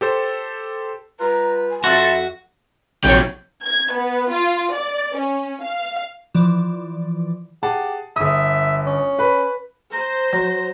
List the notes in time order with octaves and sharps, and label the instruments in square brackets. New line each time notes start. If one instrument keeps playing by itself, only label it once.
[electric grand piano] G4 A4 C5
[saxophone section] G3 F4 B4 [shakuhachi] A#5
[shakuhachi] G#5
[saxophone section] F2 [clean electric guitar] F#4 [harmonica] A4 A5 C6 [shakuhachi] E5
[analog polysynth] A#1 C#5 [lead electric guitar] C3 F#3 [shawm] G5
[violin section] G#6
B3
F4
D5
C#4
F5
[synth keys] E3 F3 D5 D6
[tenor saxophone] G4 [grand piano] G#4 F#5 A5
[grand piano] G1 D#6 [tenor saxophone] E5
[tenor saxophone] C#4
[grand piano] B4 B5
[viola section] C5 [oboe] A#5
[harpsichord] F#3 [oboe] A#5